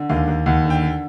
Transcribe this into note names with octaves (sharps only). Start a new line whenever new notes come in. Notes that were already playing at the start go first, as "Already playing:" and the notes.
Already playing: D3
D#2 F5
D#2
D#2 F#5
D3
G5
D3